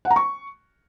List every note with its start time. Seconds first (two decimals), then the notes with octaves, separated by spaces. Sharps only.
0.05 F#5
0.11 A#5
0.16 C#6